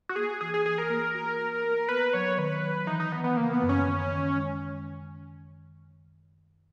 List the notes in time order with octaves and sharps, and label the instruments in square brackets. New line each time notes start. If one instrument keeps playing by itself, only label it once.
[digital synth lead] F#4
[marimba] A#3 [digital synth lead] G#4
[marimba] E3 [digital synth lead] G#4
[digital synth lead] G#4
[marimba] E3 [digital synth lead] G#4
[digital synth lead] A#4
[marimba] A#3
F#4
A#3
A#3
[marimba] B3 [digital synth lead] B4
[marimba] F#3 [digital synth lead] C#5
[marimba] D#3 [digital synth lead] B4
[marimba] F#3
[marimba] E3 [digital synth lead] D#4
[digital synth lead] D#4
[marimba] E3 [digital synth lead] B3
[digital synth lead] B3
[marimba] C#3 [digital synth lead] A#3
[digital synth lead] B3
[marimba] F#2
[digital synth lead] C#4
[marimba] D#3
D#3
G#3